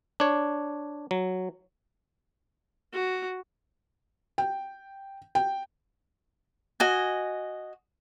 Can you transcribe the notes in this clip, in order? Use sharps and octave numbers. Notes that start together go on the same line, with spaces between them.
D4 C#5
F#3
F#4
G5
G5
F#4 D#5 G#5